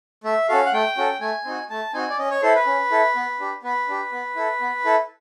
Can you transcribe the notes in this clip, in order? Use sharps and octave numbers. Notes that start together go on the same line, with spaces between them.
A3 E5
C#4 F#4 A4 F5
F#5
A3 G5
C#4 F#4 A4
A3 G#5
C4 D#4 F#4
A3 A5
C4 D#4 F#4 G#5
D5
C#4 D#5
C#5
E4 A4 C5
B4
C#4
E4 A4
B3
D4 G4
B3 B4
D4 G4
B3
E4 A4
B3
E4 A4